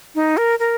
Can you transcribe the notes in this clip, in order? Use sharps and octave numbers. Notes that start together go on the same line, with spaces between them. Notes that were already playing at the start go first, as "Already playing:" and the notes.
D#4
A#4
A#4